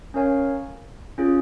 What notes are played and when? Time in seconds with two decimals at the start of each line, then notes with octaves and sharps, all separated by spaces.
0.14 C#4 A#4 C#5 F5 G#5
1.18 C#4 F4 G#4